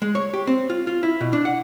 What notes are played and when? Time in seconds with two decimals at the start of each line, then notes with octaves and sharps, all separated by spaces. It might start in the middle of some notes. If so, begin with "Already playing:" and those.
0.02 G#3
0.15 C#5
0.34 G4
0.47 C4
0.70 F4
0.87 F4
1.03 E4
1.21 B2
1.33 D4
1.45 F#5